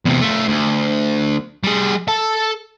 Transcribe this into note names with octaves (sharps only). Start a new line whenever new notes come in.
E2 C3
A3 F4
D2
G3 G#4
A4 A5